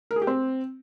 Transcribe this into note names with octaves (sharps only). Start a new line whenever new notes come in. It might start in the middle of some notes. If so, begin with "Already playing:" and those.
A#4
G#4
G4
C4